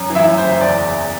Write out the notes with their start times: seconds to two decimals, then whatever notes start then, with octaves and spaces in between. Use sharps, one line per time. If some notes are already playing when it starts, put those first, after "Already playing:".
Already playing: F#2
0.10 E3
0.15 E4 E5
0.27 F#2
0.38 C5
0.44 F#1
0.61 E2 D5
0.78 E2